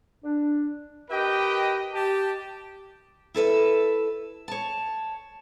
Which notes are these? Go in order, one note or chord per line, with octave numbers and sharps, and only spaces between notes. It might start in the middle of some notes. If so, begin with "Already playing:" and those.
D4
G4 A#4 B4 D#5 G5
G4 A5
E4 A4 B4 E5
C#5 A5